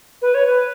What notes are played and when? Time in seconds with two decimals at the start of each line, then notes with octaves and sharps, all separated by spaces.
0.22 B4
0.34 C#5
0.46 B4